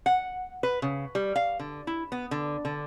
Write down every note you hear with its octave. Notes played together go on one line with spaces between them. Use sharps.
F#5
B4
C#3
G3
F5
D3
E4
B3
D3
D3